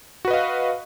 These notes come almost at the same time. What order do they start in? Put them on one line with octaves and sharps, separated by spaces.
F#4 B4 D#5 F5